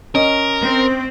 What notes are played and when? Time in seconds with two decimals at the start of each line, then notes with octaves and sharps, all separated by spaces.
0.15 C#4 A#4 D#5
0.61 C4